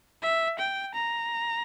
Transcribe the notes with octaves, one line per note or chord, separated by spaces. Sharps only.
E5
G5
A#5